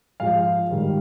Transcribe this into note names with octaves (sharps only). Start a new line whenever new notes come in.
G#2 F3 G#3 F5
G#2 D#3 G3